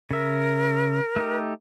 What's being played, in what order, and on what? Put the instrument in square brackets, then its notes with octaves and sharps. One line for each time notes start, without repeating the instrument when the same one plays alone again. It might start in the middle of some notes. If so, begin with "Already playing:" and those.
[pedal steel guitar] C#3 E5 [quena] A#4
[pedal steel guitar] A3 D#4 G4